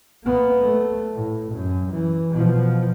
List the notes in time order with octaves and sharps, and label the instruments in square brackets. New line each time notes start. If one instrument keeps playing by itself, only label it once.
[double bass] A#3 B3
A3
A2
F#2
E3
B2 F3